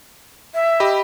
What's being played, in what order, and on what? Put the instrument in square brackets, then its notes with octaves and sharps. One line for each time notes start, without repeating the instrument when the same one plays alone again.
[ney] E5
[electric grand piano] G4 D#5 B5